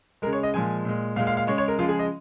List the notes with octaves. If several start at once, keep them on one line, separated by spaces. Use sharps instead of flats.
C#3 G#3 A#4
C#5
D#5
A#2 F3 G#3 G#5
A#2 G#3
A#2 G#3 F5
F5
F5
C#3 G#3 C#5
C#5
A#4
C#3 F3 G#3 F4
G#4
D#5